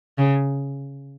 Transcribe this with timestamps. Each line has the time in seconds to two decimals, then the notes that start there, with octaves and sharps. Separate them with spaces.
0.19 C#3